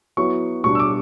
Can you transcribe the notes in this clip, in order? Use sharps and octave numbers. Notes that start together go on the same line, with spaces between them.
F#3 B3 E4 C#6
B2 G3 D4 C#6
E6
D6